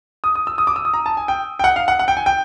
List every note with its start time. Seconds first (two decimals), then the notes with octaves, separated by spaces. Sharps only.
0.24 D#6
0.35 D#6
0.47 E6
0.58 D#6
0.67 D6
0.76 E6
0.85 D#6
0.94 A#5
1.06 A5
1.17 G#5
1.28 G5
1.59 G5
1.64 F#5
1.76 F5
1.88 F#5
1.99 F#5
2.08 G5
2.17 G#5
2.26 G5